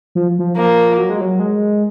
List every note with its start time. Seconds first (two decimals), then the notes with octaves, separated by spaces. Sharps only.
0.15 F3
0.39 F3
0.57 F3 A#3
0.98 F#3
1.10 G#3
1.21 F#3
1.40 G#3